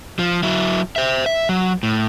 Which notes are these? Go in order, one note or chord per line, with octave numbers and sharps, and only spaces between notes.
F3
F#3 E4
C5 E5
E5
F#3
A2